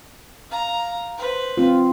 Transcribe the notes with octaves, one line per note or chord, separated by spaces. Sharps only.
F5 A#5
B4 C5
C4 F4